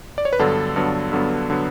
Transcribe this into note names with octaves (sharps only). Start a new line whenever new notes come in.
D5
C#5
B4
G2 D3 F#3 B3 A4
G2 D3 F#3 B3
G2 D3 F#3 B3
D3 F#3 B3